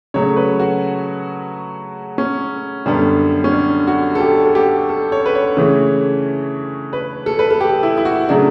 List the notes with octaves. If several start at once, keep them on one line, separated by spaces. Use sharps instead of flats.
C#3 F#3 A3 C#5
B4
F#4
C#4
F#2 D3 G3 B3
C#4
D4
F#4
A4
G4
A4
G4
A4
C#5
B4
C#5
C#3 E3 A3
B4
A4
B4
A4
G4
E4
E4
F#4
C#3 F#3 A3 D4